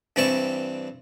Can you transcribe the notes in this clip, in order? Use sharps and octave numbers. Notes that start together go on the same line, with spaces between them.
G2 E3 C4 D5 E5 C#6